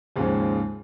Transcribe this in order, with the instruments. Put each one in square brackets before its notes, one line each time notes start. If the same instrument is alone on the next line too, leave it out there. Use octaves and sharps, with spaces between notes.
[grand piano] D#2 G#2 C#3 F3 G#3